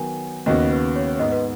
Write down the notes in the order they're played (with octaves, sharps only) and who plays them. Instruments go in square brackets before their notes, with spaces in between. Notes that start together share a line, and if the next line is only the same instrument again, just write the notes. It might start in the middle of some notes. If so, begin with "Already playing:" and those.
Already playing: [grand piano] D#3 F#3 B3 [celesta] G#5
[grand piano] D#2 C#3 B3 F#4 [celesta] D#5
[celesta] B4
C#5
[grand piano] G#2 G#3 B3 [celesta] D#5
[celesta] B4